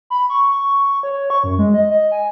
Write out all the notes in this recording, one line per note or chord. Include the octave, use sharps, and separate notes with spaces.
B5
C#6
C#5
C#6
F#2
G#3
D#5
D#5
G#5